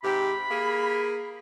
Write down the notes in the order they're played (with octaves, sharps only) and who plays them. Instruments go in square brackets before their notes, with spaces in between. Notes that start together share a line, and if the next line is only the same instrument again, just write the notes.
[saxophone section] G#2 C3 G4 [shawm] B5
[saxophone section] A#3 G#4